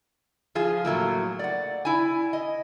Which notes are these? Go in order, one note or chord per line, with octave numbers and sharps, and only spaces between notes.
F3 F4 G#4
A2 F#3 A3 A#3
D5 F#5
E4 G#5
D#5